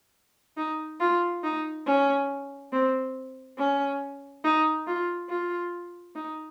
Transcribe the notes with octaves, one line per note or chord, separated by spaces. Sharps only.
D#4
F4
D#4
C#4
C4
C#4
D#4
F4
F4
D#4